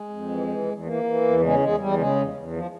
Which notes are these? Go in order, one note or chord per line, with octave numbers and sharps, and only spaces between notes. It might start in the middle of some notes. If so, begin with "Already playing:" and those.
Already playing: G#3
F2
E3
E3
E2
E3 A#3
E3
E2
C#3 G#3
E2 G#3
E2 G3
C#3 G#3
E2
E2
F3